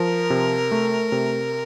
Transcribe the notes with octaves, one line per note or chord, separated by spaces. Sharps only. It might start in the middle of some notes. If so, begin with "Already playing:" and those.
Already playing: F3 A#4
C3
A3
C3